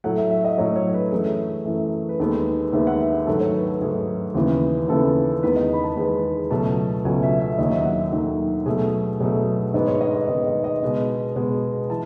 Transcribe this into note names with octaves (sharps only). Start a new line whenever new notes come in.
A2 F#3 A3 F#5
E5
E5
D#5
A2 F#3 A3 C#5
C#5
B4
F#2 E3 A3 G#4
F#2 E3 A3
B4
D#2 D#3 G#3 B3 A4
D#2 D#3 G#3 B3 E5
F#5
E5
B4
G#2 D#3 F#3 A3 A4
C#5
B4
A4
G#2 D#3 F#3 A3 G#4
D#2 C#3 E3 B3
D#2 C#3 E3 B3 A4
E2 D#3 G#3 B3 B4
D#5
B5
A5
E2 D#3 G#3 B3
C#2 B2 F#3 A3 A5
C#2 B2 F#3 A3 G#5
E5
E5
D#2 D#3 F#3 D#5
E5
F#5
E5
D#2 D#3 F#3 A4
B2 F#3 A3 G#4
B2 F#3 A3 G#4
G#2 D#3 G#3 B3 D#5
C#5
D#5
D#5
G#2 D#3 G#3 B3 D#5
D#5
D#5
B2 G#3 B3
B2 G#3 B3
E3 A5